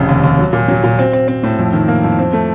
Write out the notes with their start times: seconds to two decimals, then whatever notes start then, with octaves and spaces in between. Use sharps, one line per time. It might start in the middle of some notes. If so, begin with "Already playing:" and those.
Already playing: F1 C#3
0.09 D#2
0.24 D#2
0.39 F#3
0.53 A#2
0.68 F#3
0.84 A#2
0.99 C4
1.13 C4
1.28 C4
1.43 A2
1.59 F2
1.73 D#3
1.88 A#3
2.04 F2
2.19 C4
2.33 A3